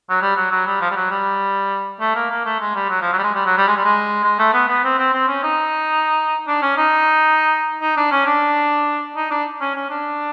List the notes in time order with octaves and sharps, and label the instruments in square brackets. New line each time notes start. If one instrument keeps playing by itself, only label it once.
[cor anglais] F#3
G3
F#3
F#3
G3
F3
G3
F#3
G3
A3
A#3
A#3
A3
G#3
G3
F#3
F3
F#3
G3
G#3
G3
F#3
G3
G#3
G3
G#3
G#3
A3
B3
B3
C4
C4
C4
C#4
D#4
D4
C#4
D#4
D#4
D4
C#4
D4
D#4
D4
C#4
C#4
D4